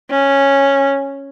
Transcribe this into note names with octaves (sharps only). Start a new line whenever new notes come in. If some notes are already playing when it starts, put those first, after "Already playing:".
C#4